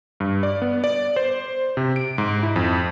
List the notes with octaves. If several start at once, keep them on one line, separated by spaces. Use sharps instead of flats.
G2
D5
B3
D5
C5
C3
D7
G#2
E4
F2